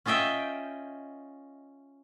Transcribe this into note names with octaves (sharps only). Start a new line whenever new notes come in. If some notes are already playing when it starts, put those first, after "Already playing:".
C#4 F4 D#5 E5 G5